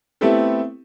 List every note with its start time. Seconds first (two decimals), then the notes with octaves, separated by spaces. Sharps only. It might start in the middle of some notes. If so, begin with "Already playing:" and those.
0.21 A3 B3 C4 E4 G4 A4